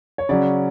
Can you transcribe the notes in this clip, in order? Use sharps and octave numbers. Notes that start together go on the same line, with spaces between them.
C#5
C#3 F#3 C#4 D5